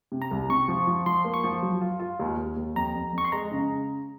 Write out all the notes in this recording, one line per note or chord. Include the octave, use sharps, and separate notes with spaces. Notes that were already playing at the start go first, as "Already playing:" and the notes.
C3
A#5
C2
C3 C#6
F3
F3
F3 C6
A#3
C#6
F3
F#3
F4
F4
D#2
D#2
D#2
F2 A#5
F2
F2 C#6
C6
G#3 A#5
C#3